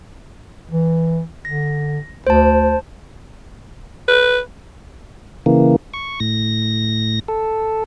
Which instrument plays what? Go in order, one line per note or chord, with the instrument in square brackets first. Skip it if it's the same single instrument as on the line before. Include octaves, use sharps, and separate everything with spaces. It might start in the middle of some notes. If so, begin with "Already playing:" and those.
[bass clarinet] E3
[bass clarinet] D3 [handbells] A#6
[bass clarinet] D2 [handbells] C5 A5
[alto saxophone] B4
[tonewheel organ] C#3 E3 A#3
C#6
A2 A#6
A4